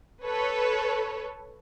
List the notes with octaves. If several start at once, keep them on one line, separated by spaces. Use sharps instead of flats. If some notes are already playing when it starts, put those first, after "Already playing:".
A4 B4 C#5